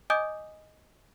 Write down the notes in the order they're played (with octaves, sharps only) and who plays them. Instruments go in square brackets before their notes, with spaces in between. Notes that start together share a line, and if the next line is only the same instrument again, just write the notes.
[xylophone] D#5 G#5 D6 D#6 G6